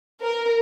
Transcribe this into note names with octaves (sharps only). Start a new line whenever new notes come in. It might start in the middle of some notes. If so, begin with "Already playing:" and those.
A#4